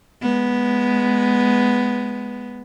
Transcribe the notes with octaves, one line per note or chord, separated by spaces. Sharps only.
G#3 B3